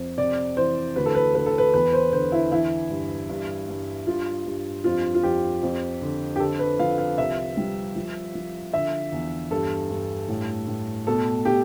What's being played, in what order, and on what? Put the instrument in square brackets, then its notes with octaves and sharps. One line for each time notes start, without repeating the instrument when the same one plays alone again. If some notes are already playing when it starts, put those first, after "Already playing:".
Already playing: [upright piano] F2
C3 D5
E3 C5
D2 B4
A4
B4
D2 B4
A4
B4
E2 B4
C5
D3 C5
E4
E3 E4
G2
G2
G2
G2 F4
G2
F2 F4
F4
F2 G4
F2
D3
G4
D3 A4
B4
F3 F5
F5
C2 E5
G3
F3
F3
D3 E5
E2
G2 A4
G2
A2
A2
B2 A4
B2 G4